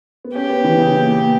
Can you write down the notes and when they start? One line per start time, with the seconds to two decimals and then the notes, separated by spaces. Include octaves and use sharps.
0.25 B3
0.35 C#4 G4
0.50 B3
0.64 E3
0.79 C#3
0.94 A#2
1.14 A#2